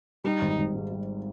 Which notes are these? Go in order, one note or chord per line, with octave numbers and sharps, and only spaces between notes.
G3 D#4
G#1
G#1
G#2
G3